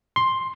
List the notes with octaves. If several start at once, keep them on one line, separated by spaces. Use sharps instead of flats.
C6